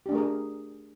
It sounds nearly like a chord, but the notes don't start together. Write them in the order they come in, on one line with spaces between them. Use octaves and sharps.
G4 D4 A3 A#4 G#4